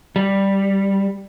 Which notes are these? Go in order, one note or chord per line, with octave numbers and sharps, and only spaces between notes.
G3